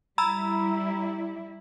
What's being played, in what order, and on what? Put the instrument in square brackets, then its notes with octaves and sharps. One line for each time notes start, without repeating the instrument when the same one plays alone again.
[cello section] G3 E4 [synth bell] A#5 B5 E6